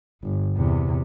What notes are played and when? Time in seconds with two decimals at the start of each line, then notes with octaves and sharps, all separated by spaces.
0.22 G1
0.55 E2 C3